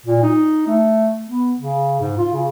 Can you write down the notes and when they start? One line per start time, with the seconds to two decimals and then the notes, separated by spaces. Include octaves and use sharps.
0.06 A#2
0.23 D#4
0.67 A3
1.27 B3
1.58 C#3
2.00 G#2
2.17 F4
2.33 C#3